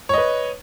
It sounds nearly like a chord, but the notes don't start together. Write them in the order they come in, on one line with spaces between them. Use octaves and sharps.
C#5 D#5 B4